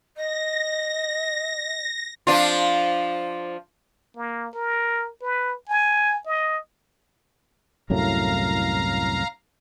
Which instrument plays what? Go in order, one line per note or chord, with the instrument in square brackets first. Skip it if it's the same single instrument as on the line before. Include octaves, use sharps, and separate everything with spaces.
[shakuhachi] D#5 [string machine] A#6
[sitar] F3 D4 F4
[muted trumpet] A#3
A#4
B4
G#5
D#5
[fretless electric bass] C2 F#2 A2 [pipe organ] F5 A#5